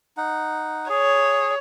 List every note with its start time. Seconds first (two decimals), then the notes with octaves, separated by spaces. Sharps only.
0.17 D#4 F#5
0.90 G#4 C#5